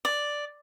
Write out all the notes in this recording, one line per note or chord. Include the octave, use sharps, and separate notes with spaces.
D5